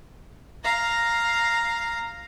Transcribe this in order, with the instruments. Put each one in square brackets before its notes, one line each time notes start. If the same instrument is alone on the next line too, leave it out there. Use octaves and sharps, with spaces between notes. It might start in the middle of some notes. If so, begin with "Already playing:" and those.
[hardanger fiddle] F5 A#5